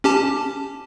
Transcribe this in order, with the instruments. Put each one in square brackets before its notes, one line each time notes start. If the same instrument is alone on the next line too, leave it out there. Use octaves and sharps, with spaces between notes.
[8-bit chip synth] C#4 G4 A5